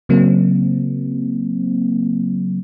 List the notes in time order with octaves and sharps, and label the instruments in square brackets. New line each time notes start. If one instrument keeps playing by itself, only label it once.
[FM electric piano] C#3 F#3 A#3 C4